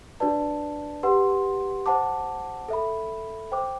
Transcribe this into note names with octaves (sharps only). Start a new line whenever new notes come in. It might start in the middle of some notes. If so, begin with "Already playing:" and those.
D4 F#4 B4 D5 A5
G4 B4 F#5 C6
C5 F#5 A5 D6
A4 E5 B5
C5 G5 D6